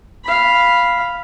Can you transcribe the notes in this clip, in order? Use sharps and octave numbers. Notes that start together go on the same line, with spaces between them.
F5 B5